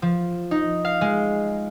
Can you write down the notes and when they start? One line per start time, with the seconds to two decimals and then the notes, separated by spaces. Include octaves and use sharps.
0.02 F3
0.51 D#4
0.85 F5
1.01 G#3